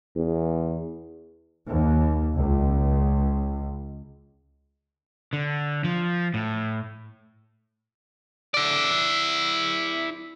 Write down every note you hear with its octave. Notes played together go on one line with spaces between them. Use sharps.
E2
D#2
C#2
D3
F3
A2
E4 D5